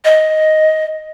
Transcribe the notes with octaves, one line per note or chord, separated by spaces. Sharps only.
D#5